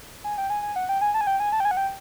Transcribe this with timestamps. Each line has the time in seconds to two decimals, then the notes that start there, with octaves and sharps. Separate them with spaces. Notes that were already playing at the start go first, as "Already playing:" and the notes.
0.24 G#5
0.38 G5
0.50 G#5
0.62 G#5
0.76 F#5
0.89 G5
1.01 G#5
1.14 A5
1.21 G#5
1.27 G5
1.40 G#5
1.52 A5
1.60 G5
1.65 G#5
1.71 F#5
1.77 G5